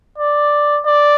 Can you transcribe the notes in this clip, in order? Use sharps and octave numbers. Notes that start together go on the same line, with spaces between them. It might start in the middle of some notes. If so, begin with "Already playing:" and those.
D5
D5